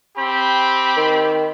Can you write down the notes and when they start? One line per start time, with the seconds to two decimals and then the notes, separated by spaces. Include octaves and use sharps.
0.17 C4 G4 B5
0.96 D#3